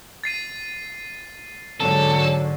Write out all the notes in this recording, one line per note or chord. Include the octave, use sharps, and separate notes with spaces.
A6 C7 D#7
G#2 D3 F#3 A4